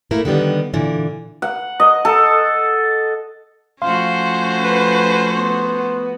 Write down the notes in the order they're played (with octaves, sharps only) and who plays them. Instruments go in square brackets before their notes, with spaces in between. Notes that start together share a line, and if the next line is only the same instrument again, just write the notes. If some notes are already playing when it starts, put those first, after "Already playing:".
[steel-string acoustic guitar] A3 A#3 E4 A#4
D3 D#3 G3 B3
A#2 D3 E3
[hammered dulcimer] F#5
D#5
A4
[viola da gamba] F3 A3 F#4 [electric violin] C#4 C5 [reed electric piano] F5 C6
[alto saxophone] B4
[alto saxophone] B3 [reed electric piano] C6